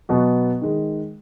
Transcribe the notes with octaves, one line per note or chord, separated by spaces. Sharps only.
B2 F#3 B3 F#4
D#3 G#3